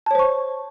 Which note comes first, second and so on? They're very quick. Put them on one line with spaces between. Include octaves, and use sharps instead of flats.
A5 C#5 C5 C#6